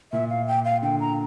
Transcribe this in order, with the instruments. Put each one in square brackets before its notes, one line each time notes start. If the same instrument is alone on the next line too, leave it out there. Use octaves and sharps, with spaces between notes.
[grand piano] A#2 [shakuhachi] E5
[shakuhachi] F5
G5
F5
[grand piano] D3 [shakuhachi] G5
[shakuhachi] A#5